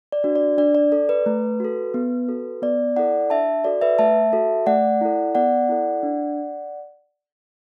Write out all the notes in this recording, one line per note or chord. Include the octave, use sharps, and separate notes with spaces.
D5
D4 F#4
D5
D4 D5
D5
A4 D5
B4
A3
F#4 A4
B3
F#4 A4
B3 D5
E4 A4 D5 F#5
D4 E5 A5
F#4 A4 D5
B4 E5
A3 E5 A5
F#4 A4
A3 D5 F#5
E4 A4
B3 D5 F#5
E4 A4
D4